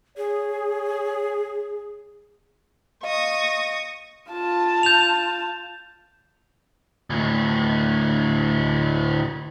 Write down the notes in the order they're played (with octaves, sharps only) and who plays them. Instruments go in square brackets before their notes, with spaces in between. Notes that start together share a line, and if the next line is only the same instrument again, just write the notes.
[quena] G#4 [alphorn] C#5
[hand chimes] D#5 F5 [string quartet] C#6 D#6 A#6
[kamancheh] F4 A5
[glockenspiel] G6 F7
[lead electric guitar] D2 A2